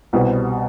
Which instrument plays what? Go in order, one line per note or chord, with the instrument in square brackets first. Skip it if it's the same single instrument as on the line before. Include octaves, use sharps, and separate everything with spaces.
[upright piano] C2 B2 G3 C4